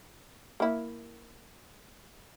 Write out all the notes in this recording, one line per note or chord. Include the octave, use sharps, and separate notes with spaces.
A#3 E4